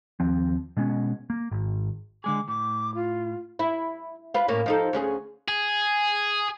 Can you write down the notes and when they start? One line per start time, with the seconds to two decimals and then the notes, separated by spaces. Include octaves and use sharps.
0.20 D#2 F3 C4
0.77 B2 G#3 B3 C#4
1.30 A#3
1.51 G#1
2.24 D3 G#3 G#4 D6
2.48 A2 D6
2.95 F4
3.59 E4
4.34 F4 B4
4.48 A2 A#3 C#4
4.66 F3 D#4 A4
4.93 D2 C#4 G#4
5.48 G#4